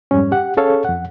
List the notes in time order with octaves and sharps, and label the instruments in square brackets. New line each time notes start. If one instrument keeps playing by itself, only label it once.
[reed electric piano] F2 G#2 G3 C#4
G4 F#5
C#4 G#4 A4 C#5 F5
F2 F#5